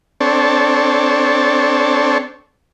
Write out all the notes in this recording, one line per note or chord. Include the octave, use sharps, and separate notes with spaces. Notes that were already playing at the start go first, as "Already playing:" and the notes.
C4 D4 A4 C#5